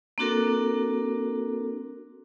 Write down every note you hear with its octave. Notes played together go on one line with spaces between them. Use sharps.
A#3 C4 D4 F#4 A4 A#4